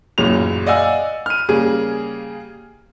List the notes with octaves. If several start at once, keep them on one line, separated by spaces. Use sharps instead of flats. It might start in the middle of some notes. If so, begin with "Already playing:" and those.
A1 F#2 A#2 C#3 F7
D5 D#5 F5 F#5 G#5 E6
F6 D#7
C#3 G3 A#3 G#4